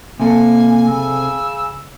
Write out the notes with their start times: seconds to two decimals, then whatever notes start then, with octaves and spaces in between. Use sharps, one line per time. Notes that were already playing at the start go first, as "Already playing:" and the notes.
0.20 C3 A#3 A4 G#5
0.88 C#3 E6